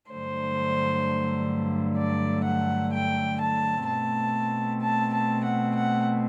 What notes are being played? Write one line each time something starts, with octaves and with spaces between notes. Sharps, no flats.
G2 D3 F#3 A3 C5
D5
F#5
G5
A5
B2 A3 C4 A5
A5
A5
F#5
F#5